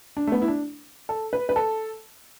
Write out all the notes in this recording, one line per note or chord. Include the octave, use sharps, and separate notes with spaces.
D4
A3
B3
E4
D4
A4
B4
B4
A4